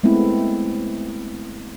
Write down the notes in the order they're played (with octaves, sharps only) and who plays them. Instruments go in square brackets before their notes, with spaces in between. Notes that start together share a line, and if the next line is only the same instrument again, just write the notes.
[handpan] G#3 A3 B3 C4 E4